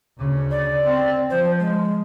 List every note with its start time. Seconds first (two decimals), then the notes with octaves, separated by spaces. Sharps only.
0.19 D2 C#3
0.51 D5
0.84 C4
1.30 F3 C5
1.60 G#3